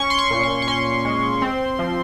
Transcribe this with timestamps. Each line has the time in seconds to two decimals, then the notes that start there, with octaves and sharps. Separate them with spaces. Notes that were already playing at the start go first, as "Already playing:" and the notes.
Already playing: C#4 C#6
0.10 C6
0.19 C#6
0.30 A#2
0.43 C#6
0.62 C#6
0.68 C#4 C6
1.05 G#3
1.42 C4
1.79 F3